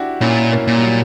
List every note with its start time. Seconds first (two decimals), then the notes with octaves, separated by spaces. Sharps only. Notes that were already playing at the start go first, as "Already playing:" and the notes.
Already playing: D4 E4 F#4 G4
0.21 A#2 C#4 E4
0.52 A#3 C#4
0.67 A#2
0.77 G3
0.82 F#3 A#3